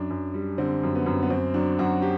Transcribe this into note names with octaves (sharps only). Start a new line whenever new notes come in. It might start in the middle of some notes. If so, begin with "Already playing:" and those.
Already playing: F#2 D4
F#2
G3
D3 C4
F#2
B3
F#2
B3
F#2 C4
F#3 D4
F#2 F#4
G4